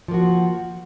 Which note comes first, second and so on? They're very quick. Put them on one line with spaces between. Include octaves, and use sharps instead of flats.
F3 A#3 F#4